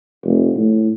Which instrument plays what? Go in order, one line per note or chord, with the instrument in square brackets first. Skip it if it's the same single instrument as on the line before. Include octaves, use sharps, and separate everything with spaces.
[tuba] F1
A2